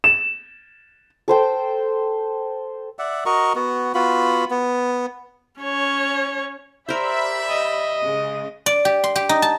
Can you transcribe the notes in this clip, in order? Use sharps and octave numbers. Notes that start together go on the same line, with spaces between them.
E7
A4 C5 G5
D5 E5 F#5
F#4 A#4 D#5 C#6
B3 F#4
B3 F4 F#4 B5
B3
C#4 C#5
G4 A#4 C5 D5 E5 B5
D#5
C#3 G#3
D5
G4
C6
G4
D#4
A5